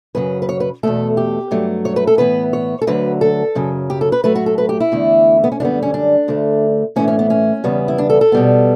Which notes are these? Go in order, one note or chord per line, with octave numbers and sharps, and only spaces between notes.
F#2 C#3 F#3 B4
B4
C#5
B4
E2 B2 A3 A4
G4
G2 F#3 A3
C#5
B4
A4
A2 E3 B3 B4
C#5
A4
D2 D3 F#3 B4
A4
F#2 C#3 F#3
G4
A4
B4
A2 F#3 A3 B4
F#4
A4
B4
G4
E4
E2 D3 A3
B3
C#4
F#2 D3 G3 B3 D4
C#4
D4
D2 D3 A3
A2 E3 A3 C#4
C#4
B3
C#4
E2 C#3 G3 B3
E4
D4
A4
A4
B2 G3 B3